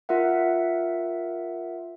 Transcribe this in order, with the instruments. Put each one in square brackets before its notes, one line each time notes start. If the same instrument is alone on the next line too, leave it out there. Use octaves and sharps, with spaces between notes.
[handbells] F4 A#4 E5 F#5